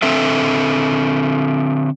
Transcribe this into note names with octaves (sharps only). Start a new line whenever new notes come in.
D3 C4 A4 E5